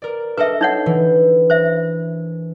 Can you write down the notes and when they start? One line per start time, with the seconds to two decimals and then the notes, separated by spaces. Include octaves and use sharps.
0.02 A#4 D5
0.37 D4 A4 B4 D#5 E5
0.61 D#4 C#5 F#5
0.86 E3
1.50 C5 E5